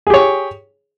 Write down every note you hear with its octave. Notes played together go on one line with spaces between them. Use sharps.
G4 G#4 C#5